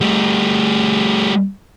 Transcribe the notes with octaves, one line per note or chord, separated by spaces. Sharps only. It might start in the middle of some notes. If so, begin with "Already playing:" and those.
G3 A3